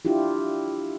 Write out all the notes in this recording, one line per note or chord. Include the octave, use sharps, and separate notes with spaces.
D4 E4 F4 G4